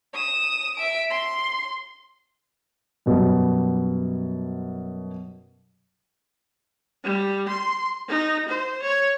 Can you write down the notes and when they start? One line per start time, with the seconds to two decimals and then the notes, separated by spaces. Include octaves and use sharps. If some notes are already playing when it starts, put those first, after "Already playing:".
0.14 D#6 E7
0.76 E5 D7
1.11 C6
3.06 F#2 B2 G3
7.04 G3
7.49 C6
8.08 D#4
8.48 C5
8.82 C#5